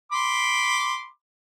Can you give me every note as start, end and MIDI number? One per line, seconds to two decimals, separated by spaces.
0.12 1.07 83
0.12 1.07 84
0.12 1.07 86